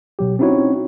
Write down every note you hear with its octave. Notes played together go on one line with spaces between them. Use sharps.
B2 F#3 G4
C4 C#4 D#4 E4 F#4 C#5